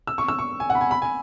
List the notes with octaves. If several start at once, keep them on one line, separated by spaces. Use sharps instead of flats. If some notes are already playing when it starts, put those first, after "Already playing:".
E6
C#6
E6
C#6
G#5
F#5
B5
G#5
B5
G#5